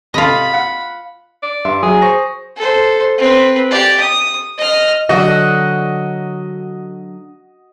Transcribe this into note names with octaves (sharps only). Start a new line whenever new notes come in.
C3 F4 A4 D#5 B5
F5 F#5
D5
G2 E5 C6
F#3 G#4
C5 C#6 A#6
A4 C5
C4 B4
G4 D5
D#6
D#5 F6
D3 F#3 F#4 D#5